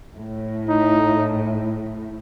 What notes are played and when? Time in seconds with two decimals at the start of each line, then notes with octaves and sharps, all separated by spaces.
0.15 A2
0.69 D#4